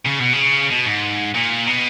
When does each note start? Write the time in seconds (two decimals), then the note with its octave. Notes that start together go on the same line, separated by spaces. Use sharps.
0.05 C#3
0.19 B2
0.33 C#3
0.70 B2
0.86 G#2
1.35 A#2
1.67 B2